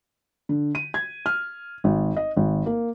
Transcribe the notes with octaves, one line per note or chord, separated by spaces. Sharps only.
D3
D#7
G#6
F6
G#1
D#5
G#1
A#3